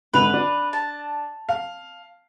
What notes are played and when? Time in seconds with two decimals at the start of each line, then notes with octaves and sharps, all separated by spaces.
0.14 G#1 D3 B4 F7
0.33 D4
0.73 A5
1.49 F5